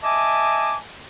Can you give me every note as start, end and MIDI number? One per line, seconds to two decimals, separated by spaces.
0.03 0.76 75
0.03 0.76 76
0.03 0.76 80
0.03 0.76 81
0.03 0.76 86